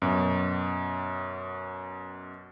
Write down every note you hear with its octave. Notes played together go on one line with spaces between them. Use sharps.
F#2 B2